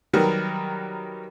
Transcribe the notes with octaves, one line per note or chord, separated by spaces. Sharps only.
D#3 F#3 G3 A#4 B4